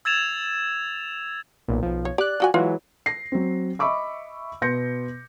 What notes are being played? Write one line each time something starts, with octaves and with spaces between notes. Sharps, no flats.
E6 G#6 A6 E7 F7
B1 A#2
B1 F3
C#5
G4 D5 F#6
F3 F#4 G#5
E3 F#3 G#3 F4
A#6 C7
F#3 C4
D#5 E5 B5 C#6 D6 E6
B2 B3 C6 G6 A#6 C#7